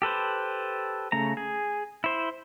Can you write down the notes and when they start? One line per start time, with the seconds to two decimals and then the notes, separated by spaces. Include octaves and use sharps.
0.02 G4 A4 B4 C5
1.12 C#3 A3 A#5
1.37 G#4
2.04 E4 C5